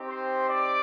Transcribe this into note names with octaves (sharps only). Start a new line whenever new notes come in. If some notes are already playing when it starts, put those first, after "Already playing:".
Already playing: C4 D#4 G4
C5 C6
D5 D6